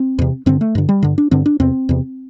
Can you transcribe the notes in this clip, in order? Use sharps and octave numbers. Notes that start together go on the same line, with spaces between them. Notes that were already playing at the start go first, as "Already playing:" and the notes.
Already playing: C4
E2 C3
G2 D3 C4
A3
G2 D3
G3
G2 D3
D4
G2 D3 C4
D4
E2 C3 C4
E2 C3